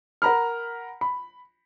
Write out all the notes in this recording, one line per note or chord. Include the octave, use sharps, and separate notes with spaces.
A#4 F#5 A#5 B5 F6
B5